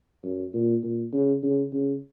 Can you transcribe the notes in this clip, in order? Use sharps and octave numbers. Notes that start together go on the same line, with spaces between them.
F#2
A#2
A#2
C#3
C#3
C#3